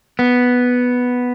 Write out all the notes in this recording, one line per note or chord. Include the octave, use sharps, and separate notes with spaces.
B3